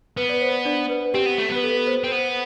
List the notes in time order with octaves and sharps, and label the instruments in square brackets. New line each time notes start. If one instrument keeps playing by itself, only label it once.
[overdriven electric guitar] B3 [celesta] B4
[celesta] D5
C5
D4 D5
B4
[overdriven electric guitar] C4 [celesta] G4
[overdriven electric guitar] B3
A3
B3
[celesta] B4
A4
C5
[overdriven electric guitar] C4
[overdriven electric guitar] B3 [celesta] C5